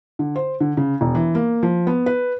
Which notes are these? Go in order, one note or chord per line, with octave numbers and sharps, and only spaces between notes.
D3
C5
D3
C#3
E1
E3
A#3
F3
B3
B4